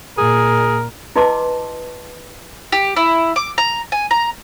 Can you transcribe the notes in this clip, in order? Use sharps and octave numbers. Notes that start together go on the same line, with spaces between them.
A#2 G#4 A#4
E4 B4 D#5 A5 C6 D6
G4
E4
D6
A#5
G#5
A#5